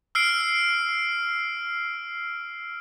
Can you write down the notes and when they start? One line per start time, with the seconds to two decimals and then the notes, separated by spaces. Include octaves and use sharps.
0.15 E6 F6 C7 D7